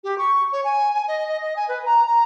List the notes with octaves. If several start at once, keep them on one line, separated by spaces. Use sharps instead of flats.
G4
C#6
C#5
G#5
G#5
D#5
D#5
D#5
G#5
B4
A#5
A#5